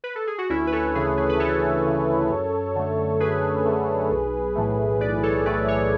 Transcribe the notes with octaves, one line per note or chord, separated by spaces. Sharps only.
B4
A4
G#4
F#4
D2 C#4 E4
B4
A4 C#5
C#3 E3 G#4 B4
G#4 B4
B4
D2 A4 C#5
C#3 E3
F#2
D3 A3
F#2 G#4 B4
D3 A3
B1
A2 E3 A3
B1 B4 D5
A4 C#5
A2 E3 A3 B4 D5
A4 C#5